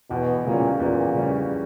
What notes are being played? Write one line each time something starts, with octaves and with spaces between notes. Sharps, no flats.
E2 B2
A#2 C#3 G3 C#4
E2 A#2
C#3 G3 C#4